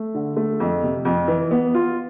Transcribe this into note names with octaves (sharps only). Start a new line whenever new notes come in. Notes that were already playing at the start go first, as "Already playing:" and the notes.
Already playing: A3
D3
A3
F2
C3
F2
E3
B3
F4